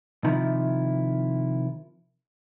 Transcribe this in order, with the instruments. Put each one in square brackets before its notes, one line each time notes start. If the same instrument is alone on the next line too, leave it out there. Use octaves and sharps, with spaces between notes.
[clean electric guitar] C3 D#3 F3 E4